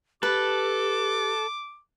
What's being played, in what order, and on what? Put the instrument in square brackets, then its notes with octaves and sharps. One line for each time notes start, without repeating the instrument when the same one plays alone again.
[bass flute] G4 [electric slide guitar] A4 [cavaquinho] B4 [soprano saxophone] D6